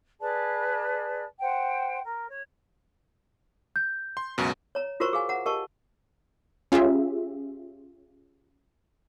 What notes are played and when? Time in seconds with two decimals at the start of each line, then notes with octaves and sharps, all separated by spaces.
0.20 G#4 B4 D5 A5
1.40 C5 F#5 G5
2.05 A#4
2.28 C#5
3.76 G6
4.17 C6
4.38 C#2 F#2 B2
4.75 C#5 A#5
5.00 F4 F#4 A#4 C5 A#5 C#6
5.13 G#4 F5 G#5
5.29 F#5 A#5
5.46 G4 A#4 D#5 A5 C#6
6.72 C#4 F4 G4 G#4 E5